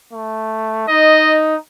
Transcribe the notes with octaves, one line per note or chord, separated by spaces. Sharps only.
A3
D#4 D#5